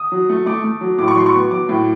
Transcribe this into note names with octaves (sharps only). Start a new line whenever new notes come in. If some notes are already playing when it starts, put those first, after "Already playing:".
Already playing: D#6
F#3
A3
A3 D6
A3
F#3
A2 D6
C#6
F#3 C6
C#6
B3
F#3 D6
A2